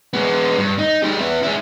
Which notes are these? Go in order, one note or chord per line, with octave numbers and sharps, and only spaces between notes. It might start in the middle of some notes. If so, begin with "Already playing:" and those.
G#3 B3
G2
D#4
G#3 G4
B3 E4
G#3 E4